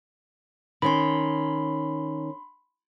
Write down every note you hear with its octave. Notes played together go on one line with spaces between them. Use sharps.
D#3 C#4 B5 C6